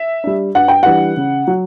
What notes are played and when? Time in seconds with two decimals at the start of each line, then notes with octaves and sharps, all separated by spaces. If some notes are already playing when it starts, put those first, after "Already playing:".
Already playing: E5
0.24 G3 D4
0.55 G2 F#5
0.68 G5
0.83 E3 G3 D4 F#5
1.17 C#3
1.47 F#3